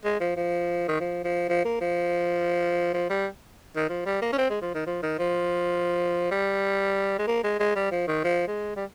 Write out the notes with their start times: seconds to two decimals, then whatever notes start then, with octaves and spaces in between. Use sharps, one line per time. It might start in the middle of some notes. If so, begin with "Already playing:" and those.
0.04 G#3
0.20 F3
0.36 F3
0.88 D#3
1.00 F3
1.25 F3
1.49 F3
1.65 A#3
1.81 F3
2.94 F3
3.10 G3
3.76 D#3
3.90 F3
4.06 G3
4.22 A#3
4.33 C#4
4.38 C4
4.50 G#3
4.62 F3
4.74 D#3
4.87 F3
5.03 D#3
5.19 F3
6.31 G3
7.19 G#3
7.27 A#3
7.44 G#3
7.60 G#3
7.76 G3
7.91 F3
8.08 D#3
8.24 F3
8.48 G#3
8.76 G3